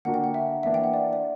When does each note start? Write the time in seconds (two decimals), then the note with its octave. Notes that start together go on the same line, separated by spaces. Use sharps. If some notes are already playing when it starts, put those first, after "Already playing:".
0.05 D3 A#3 D4 F#4 A#4 F#5
0.14 G5
0.24 F#5
0.34 E5
0.63 E3 A#3 D4 E5
0.74 G5
0.84 F#5
0.94 D5
1.13 D5